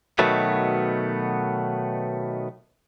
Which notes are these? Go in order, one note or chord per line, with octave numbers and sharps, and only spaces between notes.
B2 D#3 F#3 A3 B3